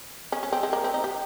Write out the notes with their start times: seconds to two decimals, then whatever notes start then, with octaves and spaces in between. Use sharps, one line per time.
0.32 C#4
0.43 C#4
0.52 C4
0.63 G#3
0.73 A#3
0.84 C4
0.94 D#4
1.04 G4